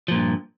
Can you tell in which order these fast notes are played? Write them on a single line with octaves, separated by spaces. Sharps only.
F3 A#2 G2